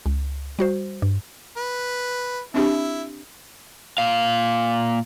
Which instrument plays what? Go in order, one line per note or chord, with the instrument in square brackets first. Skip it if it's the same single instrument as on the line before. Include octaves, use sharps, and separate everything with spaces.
[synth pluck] C#2
G3 F#4 C5
G2
[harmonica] B4
[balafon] C4 D4 G4 [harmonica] E4
[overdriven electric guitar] A#2 F5